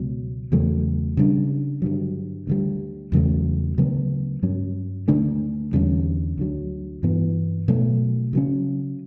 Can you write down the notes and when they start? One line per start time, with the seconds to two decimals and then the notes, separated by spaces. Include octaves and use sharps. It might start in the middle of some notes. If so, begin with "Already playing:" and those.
Already playing: C#2 B2 F#3
0.52 E2 C#3 F#3 A3
1.17 C#3 G3 D4
1.82 G2 D3 F#3
2.47 D2 D3 G3
3.12 E2 C#3 F#3 A3
3.78 D2 C#3 F#3 B3
4.43 G2 F#3 C#4
5.08 D2 D3 A3 D4
5.73 E2 D3 G3 C#4
6.38 D2 D3 F#3
7.03 G2 E3 B3
7.68 B2 F#3 A3
8.33 C#3 F#3 C#4